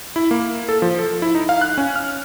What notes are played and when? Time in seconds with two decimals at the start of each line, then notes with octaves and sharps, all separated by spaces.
0.16 E4
0.31 A#3
0.69 A4
0.82 F3
0.99 A4
1.22 E4
1.35 D#4
1.49 F5
1.62 F#6
1.78 C#4
1.96 F6